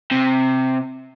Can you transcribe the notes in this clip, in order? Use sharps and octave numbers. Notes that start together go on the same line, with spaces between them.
C3